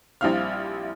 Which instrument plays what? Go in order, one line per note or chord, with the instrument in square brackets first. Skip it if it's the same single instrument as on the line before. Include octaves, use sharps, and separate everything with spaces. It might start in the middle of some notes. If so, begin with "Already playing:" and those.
[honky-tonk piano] A#1 G3 C4 E4 F5 F6